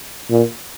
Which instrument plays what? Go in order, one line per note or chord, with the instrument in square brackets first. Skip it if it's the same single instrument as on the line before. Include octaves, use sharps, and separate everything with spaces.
[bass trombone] A#2